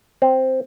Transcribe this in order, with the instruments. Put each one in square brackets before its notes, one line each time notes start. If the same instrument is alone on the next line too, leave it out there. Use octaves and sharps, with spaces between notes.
[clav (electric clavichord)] C4